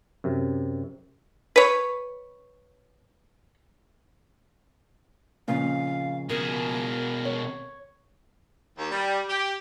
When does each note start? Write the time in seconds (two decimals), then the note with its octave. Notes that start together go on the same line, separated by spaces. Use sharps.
0.24 F#2 C3
1.56 B4 C#5
5.48 F2 A#2 C#3 F5
6.29 B2 G#4 A#4
7.25 C#5
8.78 D#2
8.91 G3
9.29 G4